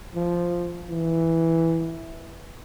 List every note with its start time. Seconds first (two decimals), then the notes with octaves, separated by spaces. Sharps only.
0.15 F3
0.89 E3